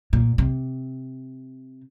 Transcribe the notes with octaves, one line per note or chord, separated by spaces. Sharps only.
A#2
C3